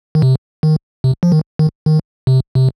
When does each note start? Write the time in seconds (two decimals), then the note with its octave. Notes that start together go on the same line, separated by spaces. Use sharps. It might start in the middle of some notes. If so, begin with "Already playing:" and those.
0.15 D#3
0.22 C3
0.63 D#3
1.04 C3
1.23 F3
1.32 D#3
1.59 D#3
1.86 D#3
2.27 C3
2.55 C3